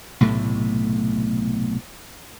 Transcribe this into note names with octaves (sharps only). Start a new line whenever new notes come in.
B1 A2 C3 A3